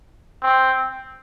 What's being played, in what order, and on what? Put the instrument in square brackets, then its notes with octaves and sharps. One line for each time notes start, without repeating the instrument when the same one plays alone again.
[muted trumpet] C4